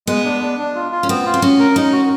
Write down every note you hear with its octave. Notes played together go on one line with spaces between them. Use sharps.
G#3 B3
D4
D4
D4
F4
F4
C#4
B3 C4
F4
C4
C#4 F#4
A#4
C#4 D#4
F#4